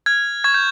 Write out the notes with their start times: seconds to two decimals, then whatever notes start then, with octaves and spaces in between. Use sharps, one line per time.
0.06 F6 G#6
0.44 C#6 G#6
0.54 G6